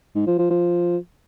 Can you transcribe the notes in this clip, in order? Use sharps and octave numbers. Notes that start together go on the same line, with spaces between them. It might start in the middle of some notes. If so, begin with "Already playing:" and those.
G#2
F3
F3
F3